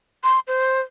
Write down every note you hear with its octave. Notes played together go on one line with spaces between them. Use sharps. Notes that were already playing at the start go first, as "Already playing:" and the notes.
C6
C5